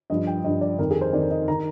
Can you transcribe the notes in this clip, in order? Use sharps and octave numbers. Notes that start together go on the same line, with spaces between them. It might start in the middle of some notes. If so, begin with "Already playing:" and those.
G2 F3 D#5
G5
G2 F3 D#5
D5
F2 D#3 A#4
G#4
C5
F2 D#3 D5
D#5
D#3 A#5